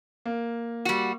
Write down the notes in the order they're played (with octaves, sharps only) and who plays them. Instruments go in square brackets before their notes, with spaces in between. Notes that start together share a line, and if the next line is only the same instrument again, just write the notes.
[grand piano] A#3
[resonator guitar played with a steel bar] G3 F#4